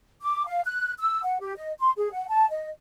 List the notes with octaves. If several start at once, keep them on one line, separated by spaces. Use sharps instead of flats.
D6
F5
F#6
E6
F#5
G4
D#5
C6
G#4
F#5
A5
D#5